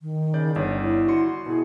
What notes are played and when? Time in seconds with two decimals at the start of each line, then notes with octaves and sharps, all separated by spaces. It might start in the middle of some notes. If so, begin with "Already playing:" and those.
0.01 D#3
0.34 C#3 D5 G6
0.56 G1 D4 C#5 D5
0.81 E4
1.08 F#4 C6 C#7
1.46 B2 E4 G#4